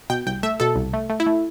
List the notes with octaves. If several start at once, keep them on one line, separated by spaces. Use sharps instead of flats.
B2 G5
C2 G5
A3 E5
B2 A4
C2
A3
A3
E4
A3